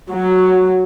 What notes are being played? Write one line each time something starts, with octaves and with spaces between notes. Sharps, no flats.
F#3